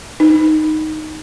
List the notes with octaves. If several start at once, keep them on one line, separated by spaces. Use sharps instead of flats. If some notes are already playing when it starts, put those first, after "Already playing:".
D#4